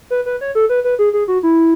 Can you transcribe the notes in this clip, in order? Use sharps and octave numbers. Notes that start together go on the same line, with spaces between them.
B4
B4
C#5
A4
B4
B4
G#4
G#4
F#4
E4